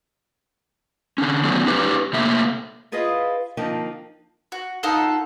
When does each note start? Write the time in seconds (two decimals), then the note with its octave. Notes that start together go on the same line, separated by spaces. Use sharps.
1.18 D3 C#4
1.43 D#3 F#3 A3 B3 C#4 D4
1.65 C#4 D#4 G4 B4
2.13 C3 A3 A#3 E5
2.92 E4 F4 G#4 B4 D#5 F5
3.57 D3 F3 A#3 C4 D4 D#4
4.52 F#4
4.83 D#4 F4 A4 F#5